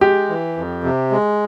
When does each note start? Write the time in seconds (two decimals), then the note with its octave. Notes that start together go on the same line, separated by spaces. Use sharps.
0.01 G#3 G4
0.29 E3
0.57 F2
0.84 C3
1.11 G#3